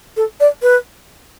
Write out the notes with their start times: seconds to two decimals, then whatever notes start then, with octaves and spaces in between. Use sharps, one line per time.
0.17 A4
0.40 D5
0.62 B4